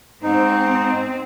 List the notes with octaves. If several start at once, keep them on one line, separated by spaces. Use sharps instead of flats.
G#2 C4 D#4